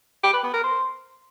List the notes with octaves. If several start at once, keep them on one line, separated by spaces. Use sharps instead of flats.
G4
B4
B3
A#4
C5